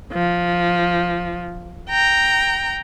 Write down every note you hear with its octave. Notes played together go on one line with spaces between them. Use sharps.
F3
G5 A#5